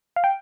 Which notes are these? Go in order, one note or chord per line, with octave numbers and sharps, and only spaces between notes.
F5
G5